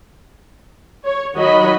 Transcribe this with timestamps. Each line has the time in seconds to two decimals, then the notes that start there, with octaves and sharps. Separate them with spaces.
1.04 C#5
1.35 D#3 F#3 F#4 C#5 D#5 B5